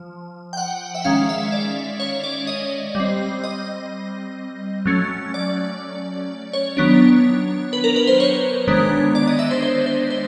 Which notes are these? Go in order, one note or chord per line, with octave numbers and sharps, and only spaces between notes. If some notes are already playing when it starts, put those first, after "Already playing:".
Already playing: F3
G5
F#5
E5
D#3 G#3 C#4 F5
E5
D5
C#5
D5
D#5
G3
C4
D#5
F#3 A3 C#4
D5
C#5
D#3 F#3 B3 D4
B4
A#4
B4
C5
C#5
D#3 G#3 B3 D4
D5
D#5
E5
C5
C5
C5
C5